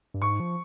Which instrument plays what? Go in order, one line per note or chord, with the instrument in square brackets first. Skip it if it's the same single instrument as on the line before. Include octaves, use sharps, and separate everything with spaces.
[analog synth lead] G2
[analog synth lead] G#2 [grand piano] C#6
[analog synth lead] F3